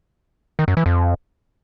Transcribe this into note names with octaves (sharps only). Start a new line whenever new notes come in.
D#3
F#2
E3
F2